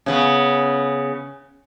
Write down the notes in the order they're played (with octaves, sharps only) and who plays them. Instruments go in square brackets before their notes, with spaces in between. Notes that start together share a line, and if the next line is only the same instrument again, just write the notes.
[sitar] C#3 B3